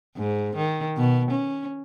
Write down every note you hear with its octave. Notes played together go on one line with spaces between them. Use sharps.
G#2
D#3
B2
C#4